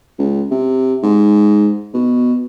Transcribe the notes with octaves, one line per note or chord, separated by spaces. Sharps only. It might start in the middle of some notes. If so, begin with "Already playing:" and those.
C#2
C3
G#2
B2